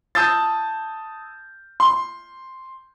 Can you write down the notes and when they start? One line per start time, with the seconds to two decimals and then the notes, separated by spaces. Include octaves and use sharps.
0.15 A5 D#6 E6 G6 A6
1.80 C6